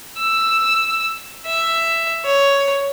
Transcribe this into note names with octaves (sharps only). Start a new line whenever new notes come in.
E6
E5
C#5